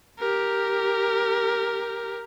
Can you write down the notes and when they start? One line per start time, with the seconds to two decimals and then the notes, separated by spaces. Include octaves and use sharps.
0.19 G4 A#4